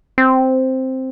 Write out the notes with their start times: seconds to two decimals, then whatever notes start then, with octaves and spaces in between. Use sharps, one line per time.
0.18 C4